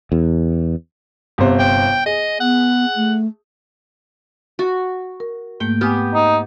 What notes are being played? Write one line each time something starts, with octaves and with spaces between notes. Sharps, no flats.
E2
G1 C3 C5
G5
G#4 D#5
B3 F#5
A3
F#4
A#4
G#2 A3 A#3 G5
B3 G4 G#5 D#6 F6
D#4